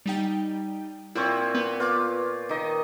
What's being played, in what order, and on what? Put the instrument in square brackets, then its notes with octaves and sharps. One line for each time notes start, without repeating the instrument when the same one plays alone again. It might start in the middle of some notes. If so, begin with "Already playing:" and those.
[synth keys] G3 D#4 G5
[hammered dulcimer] A#2 C4 C#5 [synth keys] E4
[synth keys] B3
[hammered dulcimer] F4 [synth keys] B4 D6
[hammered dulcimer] D#3 D#5